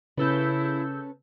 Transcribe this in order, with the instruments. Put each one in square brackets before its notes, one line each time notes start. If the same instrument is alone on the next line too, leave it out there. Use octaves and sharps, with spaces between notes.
[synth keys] C#3 E6 G6 [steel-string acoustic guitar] C#4 A4 B4 [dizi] E4